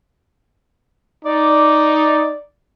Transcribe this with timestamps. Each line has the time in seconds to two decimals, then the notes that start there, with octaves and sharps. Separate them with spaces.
1.24 D#4 D5